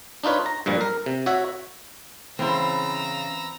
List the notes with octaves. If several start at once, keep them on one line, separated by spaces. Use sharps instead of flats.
D4 D#4 F4 B4 C#5
A#5
G2 A#2 F3 G3
A#4
C3
F#4 C#5 E5 F#5
E2 C#3 E3 C4 E4 C5 A#5 E6